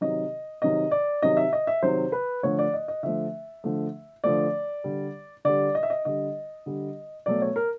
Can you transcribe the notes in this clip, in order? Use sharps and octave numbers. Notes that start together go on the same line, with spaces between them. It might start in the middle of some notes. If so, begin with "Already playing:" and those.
C3 D#3 F#3 D#5
C3 D#3 F#3 D#5
D5
C3 D#3 F#3 D#5
E5
D#5
E5
C3 D#3 F#3 C5
B4
D3 F3 A3 C#5
D5
D#5
D#5
D3 F3 A3 E5
D3 F3 A3
D3 F3 A3 D5
D3 G3
D3 G3 D5
D#5
E5
D#5
D3 G3 D#5
D3 G3
B2 F#3 A3 D5
C#5
A#4